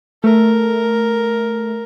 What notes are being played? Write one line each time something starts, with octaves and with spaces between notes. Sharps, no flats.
A3 A#4